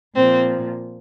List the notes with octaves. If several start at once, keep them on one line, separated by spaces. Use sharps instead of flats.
A#2 F3 C4